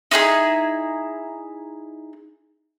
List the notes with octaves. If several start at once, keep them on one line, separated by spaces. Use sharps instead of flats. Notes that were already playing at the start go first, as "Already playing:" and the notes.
D#4 E4 G4 G#4